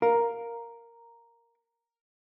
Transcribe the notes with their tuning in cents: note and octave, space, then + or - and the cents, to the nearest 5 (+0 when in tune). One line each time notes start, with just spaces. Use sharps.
A#4 +0 F5 +5